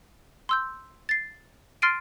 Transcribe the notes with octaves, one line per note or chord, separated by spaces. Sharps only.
C6 E6 G6
A6 C7
C6 F6 A6 C7 D7 D#7